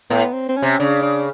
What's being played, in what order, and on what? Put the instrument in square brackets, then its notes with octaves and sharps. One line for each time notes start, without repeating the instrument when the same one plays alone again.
[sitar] A2 [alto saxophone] B3
[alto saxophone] C4
C4
C#4
[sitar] C3
[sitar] C#3 [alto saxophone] D4
[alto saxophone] D4